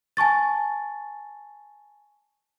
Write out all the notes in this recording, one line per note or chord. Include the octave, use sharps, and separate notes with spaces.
G#5 A5 C#6 A6